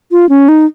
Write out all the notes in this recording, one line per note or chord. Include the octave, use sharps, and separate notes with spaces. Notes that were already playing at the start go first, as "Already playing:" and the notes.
F4
C#4
D#4